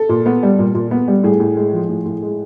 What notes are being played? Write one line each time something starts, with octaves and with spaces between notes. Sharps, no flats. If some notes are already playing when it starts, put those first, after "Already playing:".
Already playing: A4
A#2
B3
G3
A#2
A#2
B3
G3
A2 G#4
A2
G#3
F3
A2
A2
G#3